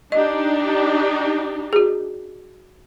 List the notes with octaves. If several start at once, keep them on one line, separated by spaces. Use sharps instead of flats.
D4 D#4 G4 D#5
F#4 G#4